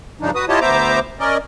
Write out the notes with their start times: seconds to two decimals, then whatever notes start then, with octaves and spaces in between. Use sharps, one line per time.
0.21 G2 C#3 F3 D4 D#4
0.35 F#4 B4 D#6
0.49 E4 F4 G4 C#5 D#5 A5
0.61 D2 B3 C5 E5 A#5 D6
1.20 C#4 A#4 D5 D#5